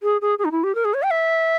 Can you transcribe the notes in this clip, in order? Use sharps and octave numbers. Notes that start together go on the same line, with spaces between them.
G#4
G#4
G#4
D#4
E4
G4
A#4
G#4
C#5
G5
E5